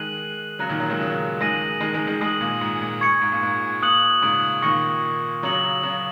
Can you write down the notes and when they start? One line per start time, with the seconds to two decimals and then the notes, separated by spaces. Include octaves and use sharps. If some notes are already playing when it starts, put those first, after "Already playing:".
Already playing: D#3 G#3 F#6 D#7 F#7
0.59 C#3 F#3 A#5 F#6 A#6 C#7
0.69 A#2 D#3
0.80 C#3 F#3
0.90 D#3 G#3
0.99 C#3 F#3
1.41 D#3 G#3 G#5 D#6 A#6 D#7 F#7
1.80 D#3 G#3
1.94 D#3 G#3
2.07 D#3 G#3
2.21 D#3 G#3 D#6 A#6 D#7 F#7
2.41 A#2
2.61 G#2
2.82 A#2
3.01 C#6 G#6 C#7
3.22 G#2
3.32 A#2
3.43 G#2
3.82 A#2 D#6 F#6 C#7 F#7
4.22 G#2 C#3
4.62 A#2 D#3 C#6 A#6 C#7
5.43 C#3 F#3 A#5 D#6 A#6 C#7 F#7
5.83 C#3 F#3